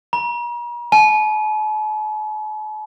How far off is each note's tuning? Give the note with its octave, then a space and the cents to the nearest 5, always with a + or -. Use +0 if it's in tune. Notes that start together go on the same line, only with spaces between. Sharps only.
A#5 +45
A5 -45